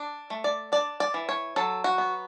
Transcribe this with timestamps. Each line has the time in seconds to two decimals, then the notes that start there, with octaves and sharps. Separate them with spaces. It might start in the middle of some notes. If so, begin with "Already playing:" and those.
Already playing: D4
0.30 A3
0.44 D5
0.72 D4 D5
1.00 D5
1.14 E3
1.29 C#5
1.56 F#3 A4
1.84 F#4
1.98 B3